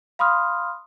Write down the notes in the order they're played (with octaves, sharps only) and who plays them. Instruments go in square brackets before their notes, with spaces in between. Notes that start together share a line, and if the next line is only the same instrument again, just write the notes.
[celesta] F5 B5 C6 D#6 F6